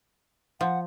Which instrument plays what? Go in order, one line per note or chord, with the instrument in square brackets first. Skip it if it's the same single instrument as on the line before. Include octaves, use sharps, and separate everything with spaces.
[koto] F3 [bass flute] F#5